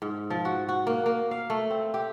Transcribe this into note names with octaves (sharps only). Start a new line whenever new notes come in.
G#2
F3
F#4
F#4
A#3
A#3
F5
A3
C4
G4